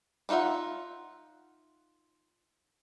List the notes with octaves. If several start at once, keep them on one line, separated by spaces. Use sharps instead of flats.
D4 D#4 F4 E5 F#5